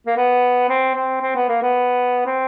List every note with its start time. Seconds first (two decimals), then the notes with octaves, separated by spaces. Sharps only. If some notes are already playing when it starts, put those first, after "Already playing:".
0.06 A#3
0.17 B3
0.69 C4
0.94 C4
1.21 C4
1.35 B3
1.49 A#3
1.62 B3
2.26 C4